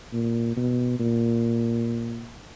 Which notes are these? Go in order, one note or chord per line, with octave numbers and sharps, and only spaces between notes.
A#2
B2
A#2